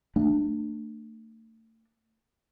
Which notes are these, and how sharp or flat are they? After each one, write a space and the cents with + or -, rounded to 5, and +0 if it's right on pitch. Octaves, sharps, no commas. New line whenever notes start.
A3 +35 D4 +20